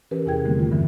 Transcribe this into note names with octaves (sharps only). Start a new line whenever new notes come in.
E3 C#4 G4 A#4 B4
E2 C3 E4 G#4 G5 G#6
D3 D#3 G3 A3 A#3 C4
F4
G2 D3 E3 C#4